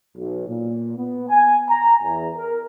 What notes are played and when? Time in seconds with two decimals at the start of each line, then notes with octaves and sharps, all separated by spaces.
0.17 B1
0.48 A#2
0.98 B3
1.29 G#5
1.70 A#5
2.03 E2
2.37 A#4